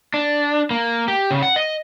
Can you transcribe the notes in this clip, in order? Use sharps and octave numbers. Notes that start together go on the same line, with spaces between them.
D4
A#3
G4
C#3
F#5
D#5